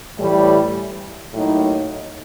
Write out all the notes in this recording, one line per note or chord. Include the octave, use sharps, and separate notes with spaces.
A2 E3 G3
A2 F#3 A#3 D#4